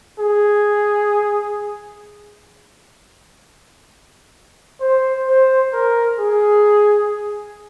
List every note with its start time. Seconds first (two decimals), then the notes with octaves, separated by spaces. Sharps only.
0.19 G#4
4.81 C5
5.27 C5
5.73 A#4
6.19 G#4